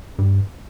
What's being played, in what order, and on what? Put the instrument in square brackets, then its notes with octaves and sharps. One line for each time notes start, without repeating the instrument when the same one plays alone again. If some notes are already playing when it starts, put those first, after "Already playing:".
[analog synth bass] G2